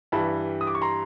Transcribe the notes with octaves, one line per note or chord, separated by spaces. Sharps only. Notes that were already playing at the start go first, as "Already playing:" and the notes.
G2 E3 G3 A5 B5
D#6
D6
C#6
A#5 C6